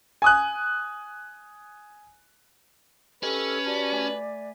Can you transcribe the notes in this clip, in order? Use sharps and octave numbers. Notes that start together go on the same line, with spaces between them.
G#5 D#6 F#6
C#4 G4 A4 B4 D#5 F6
F#4 G4 D5 A5
A3 G#5 B6